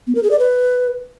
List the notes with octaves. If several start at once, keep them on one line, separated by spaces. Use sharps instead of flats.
B3
A#4
G#4
D5
B4